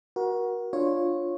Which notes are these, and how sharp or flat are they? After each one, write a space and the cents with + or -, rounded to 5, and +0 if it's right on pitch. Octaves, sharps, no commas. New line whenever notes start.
F#4 +0 A#4 +30
D4 +0 F4 +0 C#5 -10